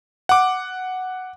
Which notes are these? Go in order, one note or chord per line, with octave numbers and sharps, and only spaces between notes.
F#5 D6